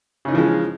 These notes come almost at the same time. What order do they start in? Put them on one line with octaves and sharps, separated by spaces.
C#3 D#4 E3 F3 G#3